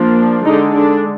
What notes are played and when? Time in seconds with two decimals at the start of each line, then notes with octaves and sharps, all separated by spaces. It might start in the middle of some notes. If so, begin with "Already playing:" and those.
Already playing: F3 A#3 D4
0.44 D3 G#3 D4 D#4
0.75 D4